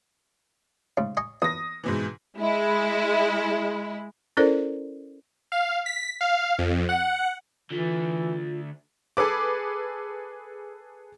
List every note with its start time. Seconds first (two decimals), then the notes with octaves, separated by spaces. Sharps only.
0.97 G#2 C#3
1.17 D#5 G#5 C#6
1.42 E2 D#6 A#6
1.84 G#2 B2 E3
2.38 G#3 E4
4.37 C#4 E4 A4 A#4 C5 D5
5.52 F5
5.86 B6
6.21 F5
6.59 F2
6.89 F#5
7.71 D3 E3 A3 F4
9.17 G#4 A4 B4 D6